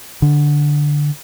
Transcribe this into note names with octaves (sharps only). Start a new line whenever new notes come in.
D3